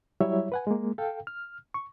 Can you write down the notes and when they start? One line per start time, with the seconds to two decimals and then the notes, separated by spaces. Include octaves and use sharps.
0.21 F#3 G3 E4 C#5 E5
0.52 B4 F#5 G#5
0.67 G#3 A#3
0.98 A4 F5 G5
1.27 F6
1.74 C#6